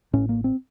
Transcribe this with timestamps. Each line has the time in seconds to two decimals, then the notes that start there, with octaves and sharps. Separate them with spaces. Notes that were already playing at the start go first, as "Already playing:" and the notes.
0.13 A1 A2 C#4
0.29 A#3
0.44 C4